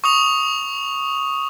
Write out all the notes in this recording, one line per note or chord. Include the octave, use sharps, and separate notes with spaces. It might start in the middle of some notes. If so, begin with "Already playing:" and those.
C#6 D#6 F7